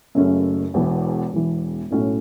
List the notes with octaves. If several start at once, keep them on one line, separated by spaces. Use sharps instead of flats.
F#1 F#2 C#3 A3 C#4
E1 E2 E3
E1 E2 E3
B1 A2 A3 C#4 F#4